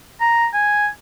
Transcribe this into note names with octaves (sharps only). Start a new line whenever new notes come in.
A#5
G#5